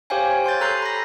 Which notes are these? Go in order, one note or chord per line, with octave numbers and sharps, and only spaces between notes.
G4 C5 C#5 F5 G5 G#5
C#5 C6 G6 A6
A4 A#5 F#6 G6 C7
B5 A#6